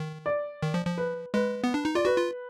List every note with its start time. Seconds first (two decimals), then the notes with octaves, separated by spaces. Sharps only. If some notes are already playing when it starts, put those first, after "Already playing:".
Already playing: D#3
0.26 D5
0.62 D#3
0.74 F3
0.86 F3
0.98 B4
1.34 G#3 B4
1.64 B3
1.74 D4
1.85 D#4
1.95 F4 D5
2.05 F#4 B4
2.17 F4